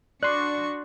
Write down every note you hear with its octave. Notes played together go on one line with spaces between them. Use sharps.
D4 F#4 D5 C6 C#6 F#6